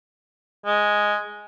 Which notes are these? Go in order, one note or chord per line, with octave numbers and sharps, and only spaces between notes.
G#3